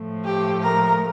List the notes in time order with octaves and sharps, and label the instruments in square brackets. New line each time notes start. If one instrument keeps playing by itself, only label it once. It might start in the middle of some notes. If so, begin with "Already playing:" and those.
Already playing: [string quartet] A2 F3 A3
G4
A#4